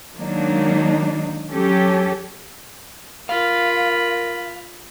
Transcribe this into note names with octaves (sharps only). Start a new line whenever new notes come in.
D#3 F#3 G#3 A#3 D4 D#4
F#3 C#4 G4 A4
F4 A#4 F5 B5